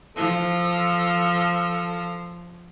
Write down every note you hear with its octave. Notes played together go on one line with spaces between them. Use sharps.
F3 A4